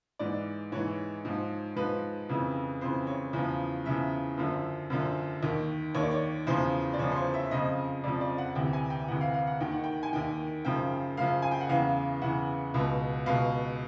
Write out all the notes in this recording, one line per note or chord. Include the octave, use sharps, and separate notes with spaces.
G#2 E3 D5
G#2 E3 C#5
G#2 F3
G#2 F3 B4
F2 C#3 E3
F2 C#3 E3 C5
C#5
E2 C#3 F3
E2 C#3 F3 E5
F#2 D3 F3
F#2 D3 F3
D#2 D#3
D#2 D#3 C#5
D5
C#5
E2 C#3 F3 C5
D5
E2 C#3 F3 C#5
C5
C#5
E5
F2 C#3 F3 D#5
F2 C#3 F3 D5
D5
F#5
D2 C3 E3 G5
G#5
G5
D2 C3 E3 F#5
F5
F5
F#5
D#2 D#3 G5
F#5
G5
G#5
D#2 D#3 G5
F#2 C#3 F3 G5
F#2 C#3 F3 F5
G#5
G5
F#5
E2 C#3 E3 F5
E2 C#3 E3 F#5
C#2 B2
C#2 B2 F5